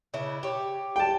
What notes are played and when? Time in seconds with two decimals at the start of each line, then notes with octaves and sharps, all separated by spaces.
0.14 C#3 D4 E4
0.43 G4 C#5
0.96 G5 A5